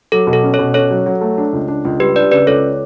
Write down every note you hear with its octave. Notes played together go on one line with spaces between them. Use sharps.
F#3 A4
B2
A4
C#4
A4 C#5
B2
C#4 A4 C#5
F#3
F#3
A3
D4
C#2
D4
C#2
G3 G4 B4
D4 B4 D5
C#3 B4 D5
C#2 A4 C#5